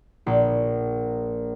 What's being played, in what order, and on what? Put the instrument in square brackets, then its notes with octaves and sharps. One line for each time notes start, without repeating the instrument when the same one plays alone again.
[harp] A#1